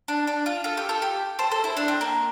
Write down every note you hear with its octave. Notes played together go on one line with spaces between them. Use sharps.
D4
D4
F4
F4 A4
G4
F4 A4
G4
A4 C5
A4 C5
E4
D4
C4
A#3